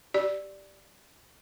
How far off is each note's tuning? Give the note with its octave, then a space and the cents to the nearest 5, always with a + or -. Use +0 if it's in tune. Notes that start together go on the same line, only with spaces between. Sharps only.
G4 -10 D5 +0